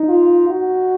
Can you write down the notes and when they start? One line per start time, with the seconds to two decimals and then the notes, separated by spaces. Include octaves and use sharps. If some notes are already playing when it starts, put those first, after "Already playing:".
Already playing: D#4
0.09 F4
0.49 F#4